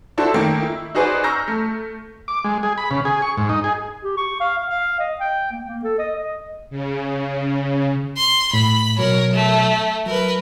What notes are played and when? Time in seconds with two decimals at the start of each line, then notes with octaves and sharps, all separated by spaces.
0.18 D4 E4 F#4 A4 C5
0.34 D#3 A3 A#3 G5
0.62 E4
0.95 D#4 F#4 G#4 B4 C5 D5
1.24 A#5 C#6 E6 F6 G6 A#6
1.48 A3
2.28 D6
2.44 G#3
2.63 G#4
2.78 B5
2.91 C#3
3.05 G#4
3.22 C#6
3.37 G#2
3.49 D#4
3.64 G#4
4.04 G4
4.17 C#6
4.40 F5
4.58 F5
4.70 F5
4.99 D#5
5.20 G5
5.52 A#3
5.67 A#3
5.84 A4
5.99 D#5
6.15 D#5
6.70 C#3
8.18 C6
8.53 A2 B5
8.98 B2 F#3 A#4 C#5
9.33 A3
10.06 F#3 A#4 B4